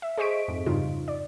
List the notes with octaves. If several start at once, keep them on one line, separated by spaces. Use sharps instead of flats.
E5
G#4 C5 D#5 C#6 B6 D7
F2 G#2
G2 C#3 D#4 F4
D5